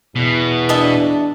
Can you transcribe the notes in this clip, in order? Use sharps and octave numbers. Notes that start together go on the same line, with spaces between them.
E2 B2
D4 D#5 E5 A5